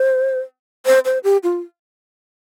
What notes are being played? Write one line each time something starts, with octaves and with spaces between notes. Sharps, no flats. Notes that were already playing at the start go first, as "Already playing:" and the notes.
Already playing: C5
C5
C5
G4
F4